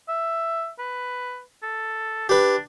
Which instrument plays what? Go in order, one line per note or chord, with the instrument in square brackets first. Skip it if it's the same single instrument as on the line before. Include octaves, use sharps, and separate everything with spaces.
[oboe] E5
B4
A4
[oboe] D4 [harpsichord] G4 B4